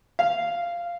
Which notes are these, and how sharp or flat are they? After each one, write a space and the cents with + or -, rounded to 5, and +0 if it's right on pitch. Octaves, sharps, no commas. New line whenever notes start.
F5 -10